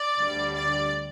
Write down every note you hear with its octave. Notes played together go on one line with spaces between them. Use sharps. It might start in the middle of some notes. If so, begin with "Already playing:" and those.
Already playing: D5
D2 D3 G3
D5